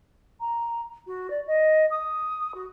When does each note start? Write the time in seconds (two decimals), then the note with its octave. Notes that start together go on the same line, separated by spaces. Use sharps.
0.41 A#5
1.07 F#4
1.30 D5
1.47 D#5
1.91 D#6
2.55 F#4